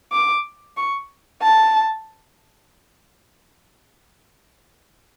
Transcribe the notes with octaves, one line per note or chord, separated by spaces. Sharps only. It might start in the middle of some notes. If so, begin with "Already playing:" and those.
D6
C#6
A5